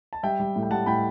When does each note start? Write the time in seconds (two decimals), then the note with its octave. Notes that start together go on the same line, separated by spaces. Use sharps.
0.13 A5
0.23 G3 E5 G5
0.40 G3
0.56 A2
0.63 G5
0.71 G3 F#5 A5
0.86 A2 G5 B5